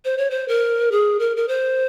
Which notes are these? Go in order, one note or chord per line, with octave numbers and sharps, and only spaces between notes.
C5
C#5
C5
A#4
G#4
A#4
A#4
C5